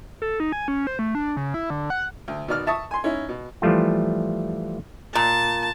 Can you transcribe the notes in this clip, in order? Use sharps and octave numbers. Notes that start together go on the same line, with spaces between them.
A4
D#4
G#5
C#4
C5
A3
D4
C#3
E4
D3
F#5
D2
B2 D#3 D5 F6
E5 A5 C#6 D#6
G#5 C6
C#4 D#4 E4
B2
E3 F3 G3 A3 F4
A#2 A5